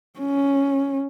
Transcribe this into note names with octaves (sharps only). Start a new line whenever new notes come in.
C#4